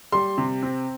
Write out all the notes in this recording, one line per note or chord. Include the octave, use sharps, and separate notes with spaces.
G3 C6
C3
C4